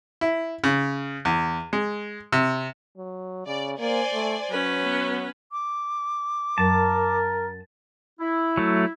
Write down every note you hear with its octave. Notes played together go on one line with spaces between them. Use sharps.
E4
C#3
E2
G#3
C3
F#3
C#3 D5
A#3 C5 D5 G#5
A3
F#3 C#4 B4
B3
D6
F#2 A#4 A5
E4
F#3 A3